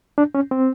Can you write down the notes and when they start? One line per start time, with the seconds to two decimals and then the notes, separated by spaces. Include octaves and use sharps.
0.18 D4
0.35 C#4
0.51 C4